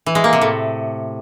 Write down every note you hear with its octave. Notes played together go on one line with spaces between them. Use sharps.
E3
G#3
A#3
C3
A2